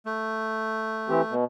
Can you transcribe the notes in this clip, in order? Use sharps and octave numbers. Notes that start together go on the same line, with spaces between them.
A3
E3 C4 G4
B2